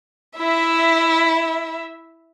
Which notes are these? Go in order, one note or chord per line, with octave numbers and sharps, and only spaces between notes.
E4 E5